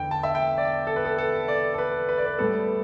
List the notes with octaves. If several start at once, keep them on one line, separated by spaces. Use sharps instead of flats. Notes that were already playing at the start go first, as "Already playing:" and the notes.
Already playing: E2 D3 G5
A5
E5
G5
D5
A4
B4
A4
A4
D5
A4
B4
B4
D5
B4
A2 G3 B3 A4